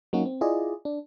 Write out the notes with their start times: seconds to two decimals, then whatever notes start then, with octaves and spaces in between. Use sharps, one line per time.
0.13 F#3 A#3 C#4 D#4 F#4
0.26 C4
0.41 E4 F4 G#4 D5 D#5
0.85 D4